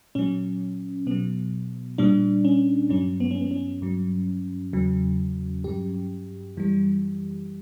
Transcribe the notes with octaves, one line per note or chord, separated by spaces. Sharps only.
A#2 F#3 C#4
B2 F#3 B3
A#2 G3 D4
C#4
G2 F#3 C#4
B3
C#4
B3
C#4
G2 F#3
E2 C#3 F#3
G2 F#3 G4
F#2 E3 G3